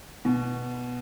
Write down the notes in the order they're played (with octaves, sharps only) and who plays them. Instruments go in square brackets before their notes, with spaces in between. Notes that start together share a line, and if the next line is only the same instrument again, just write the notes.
[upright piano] B2